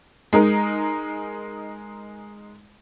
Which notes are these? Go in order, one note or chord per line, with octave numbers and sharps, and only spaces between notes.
G#3 D#4 A#4